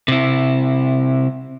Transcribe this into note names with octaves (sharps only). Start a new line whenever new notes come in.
C3 E4